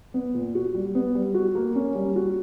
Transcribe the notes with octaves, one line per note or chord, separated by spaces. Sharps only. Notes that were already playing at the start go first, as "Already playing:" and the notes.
B3
A#2
F#4
G3
B3
G3
F#4
A#3
C#4
G3
F#4